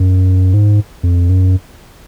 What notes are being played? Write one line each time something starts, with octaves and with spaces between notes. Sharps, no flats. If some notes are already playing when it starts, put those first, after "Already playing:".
Already playing: F#2
G#2
F2
F#2